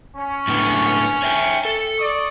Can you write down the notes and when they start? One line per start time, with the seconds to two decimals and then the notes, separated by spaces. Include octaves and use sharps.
0.17 C#4
0.48 A2 D3 B3
1.22 C#5 E5 G5
1.65 A4
1.97 D5 C#6 D#6